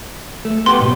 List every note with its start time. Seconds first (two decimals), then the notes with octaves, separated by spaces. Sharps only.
0.45 A3
0.66 B3 G4 C6
0.79 B1 G#2 B2